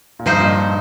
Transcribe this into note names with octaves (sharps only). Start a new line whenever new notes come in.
A#2
G2 F3 D#4 C5
A#2
G2